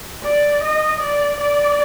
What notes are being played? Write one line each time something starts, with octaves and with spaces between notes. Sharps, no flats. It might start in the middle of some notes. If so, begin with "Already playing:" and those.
D5
D#5
D5
D5